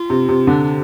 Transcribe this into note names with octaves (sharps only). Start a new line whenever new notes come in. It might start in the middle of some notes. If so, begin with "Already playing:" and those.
Already playing: F4
C3
C3
D3 D4
D4